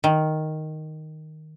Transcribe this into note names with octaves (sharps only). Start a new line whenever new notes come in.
D#3